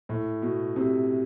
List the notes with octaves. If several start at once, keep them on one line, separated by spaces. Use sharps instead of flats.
A2
B2
C3